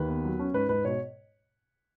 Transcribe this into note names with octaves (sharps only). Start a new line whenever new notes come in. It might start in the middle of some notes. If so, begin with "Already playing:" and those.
Already playing: D#2 B4
B3
F#3
C#4
G#2 B4
G#2 B4
B2 C#5